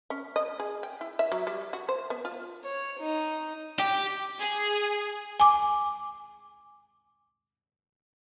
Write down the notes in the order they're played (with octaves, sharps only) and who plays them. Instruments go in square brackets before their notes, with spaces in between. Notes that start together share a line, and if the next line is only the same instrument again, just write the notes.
[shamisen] C#4
D#5
G#4
G5
E4
E5
F#3
G3
F#4
C5
B3
F4
[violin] C#5
D#4
[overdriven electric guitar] G4
[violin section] G#4
[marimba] G#5 D6